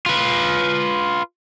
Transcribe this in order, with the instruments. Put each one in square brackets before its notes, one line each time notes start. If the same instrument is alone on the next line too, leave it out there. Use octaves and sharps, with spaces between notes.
[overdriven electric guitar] F4 B4